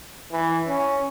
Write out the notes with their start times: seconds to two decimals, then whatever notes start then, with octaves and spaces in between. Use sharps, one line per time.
0.32 E3
0.68 C#4